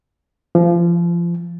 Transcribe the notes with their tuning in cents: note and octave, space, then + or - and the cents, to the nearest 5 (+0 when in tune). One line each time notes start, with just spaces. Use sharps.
F3 -30